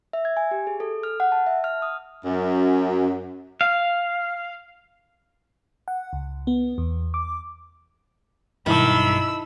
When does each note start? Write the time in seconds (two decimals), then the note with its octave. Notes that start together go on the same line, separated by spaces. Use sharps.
0.13 E5
0.25 G#6
0.37 G#5
0.51 G4
0.67 G#4
0.80 A4
1.03 F6
1.20 F#5
1.32 A5
1.46 E5
1.64 F6
1.82 D#6
2.26 F#2
3.61 F5
5.88 F#5
6.13 C#2
6.47 B3
6.78 E2
7.14 D6
8.66 B1 G2 D#3 E4 A5 B5 E6